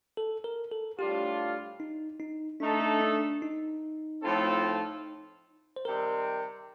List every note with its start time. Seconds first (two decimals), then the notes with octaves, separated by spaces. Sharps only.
0.17 A4
0.44 A#4
0.72 A4
0.98 A2 G3 D4 F4 G4
1.80 D#4
2.20 D#4
2.60 A3 D4 D#4 A4
2.81 D4
3.01 D4
3.42 D#4
4.23 A2 F3 C4 F4 A4
5.76 C5
5.85 C3 D#3 G3 C4 A#4